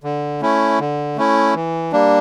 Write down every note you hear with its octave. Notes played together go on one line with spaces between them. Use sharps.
D3
A3 C#4 E4
D3
A3 C#4 E4
E3
G3 A#3 D4